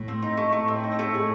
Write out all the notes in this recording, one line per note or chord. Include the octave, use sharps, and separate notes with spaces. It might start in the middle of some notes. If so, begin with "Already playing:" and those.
Already playing: A2
C4
D#4
A3
A2 A3
C4
D#4
A3
G#4